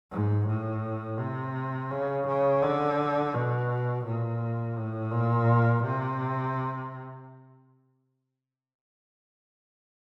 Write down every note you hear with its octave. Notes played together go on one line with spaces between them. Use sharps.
G#2
A2
C3
C#3
C#3
D3
B2
A#2
A2
A#2
C3